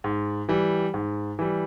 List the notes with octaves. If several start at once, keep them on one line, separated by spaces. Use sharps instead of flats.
G#2
E3 G3
G#2
E3 G3